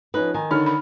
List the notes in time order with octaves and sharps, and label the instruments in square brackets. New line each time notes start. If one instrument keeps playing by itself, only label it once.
[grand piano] F3 C#4 D#4 [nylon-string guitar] B4
[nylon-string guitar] D#3 [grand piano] G#5
[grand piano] D3 C#5 F6 [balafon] D#4
[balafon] B5